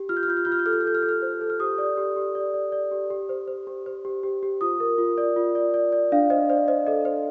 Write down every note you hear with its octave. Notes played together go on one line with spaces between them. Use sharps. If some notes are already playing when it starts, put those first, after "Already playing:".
Already playing: G4
F4 F6
G6
F6
F4 G6
F6
F4 G6
F6
G6
A4 F6
G6
F6
A4 G6
F6
A4 G6
F6
C5
A4
F6
G4 D#6
D5
G4
G4
D5
D5
D5
G4
G4
C5
C5
G4
C5
G4
G4
G4
F4 D#6
A#4
F4
D5
F4
D5
D5
D5
D4 F5
C5 D#5
C5 D5
C5 D#5
A4 D#5
C5